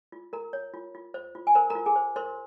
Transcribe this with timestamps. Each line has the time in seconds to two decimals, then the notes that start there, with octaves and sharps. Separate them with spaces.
0.12 F4
0.33 A#4 A#5
0.53 C#5
0.74 F4
0.95 F4
1.14 C5
1.35 F4
1.47 G#5
1.55 A#4 C5 A#5
1.70 A#4 A#5
1.75 F4
1.86 G#4 G#5
1.96 C5
2.16 A#4 C5 C6